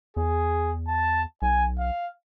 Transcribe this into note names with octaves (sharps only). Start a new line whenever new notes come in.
E2 G#4
A5
B1 G#5
F5